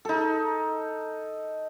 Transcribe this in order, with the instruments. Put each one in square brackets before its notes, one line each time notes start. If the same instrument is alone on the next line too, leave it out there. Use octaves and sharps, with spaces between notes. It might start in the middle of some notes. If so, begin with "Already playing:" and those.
[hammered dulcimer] D#4 A4